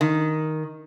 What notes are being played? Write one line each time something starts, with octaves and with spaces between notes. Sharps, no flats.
D#3